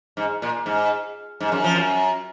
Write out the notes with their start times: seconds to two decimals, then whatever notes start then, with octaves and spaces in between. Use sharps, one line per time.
0.17 G#2
0.42 A#2
0.66 G#2
1.40 G#2
1.52 F#2
1.64 F3
1.76 F#2